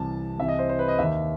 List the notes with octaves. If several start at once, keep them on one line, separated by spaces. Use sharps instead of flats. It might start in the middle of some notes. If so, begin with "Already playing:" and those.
Already playing: C2 C3 E3 A5
C2 C3 E3 E5
D#5
C5
C5
B4
D#5
D#2 D#3 E5